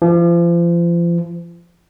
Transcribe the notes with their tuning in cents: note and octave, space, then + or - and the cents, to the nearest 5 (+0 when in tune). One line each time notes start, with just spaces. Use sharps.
F3 -35